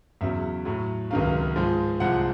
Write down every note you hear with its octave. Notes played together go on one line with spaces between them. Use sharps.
E2 C#3 F#3 E5
A2 F#3
C#2 C3 D#3 F#3 F5
G#2 F3 G#3
C2 C3 F3 G#3 F#5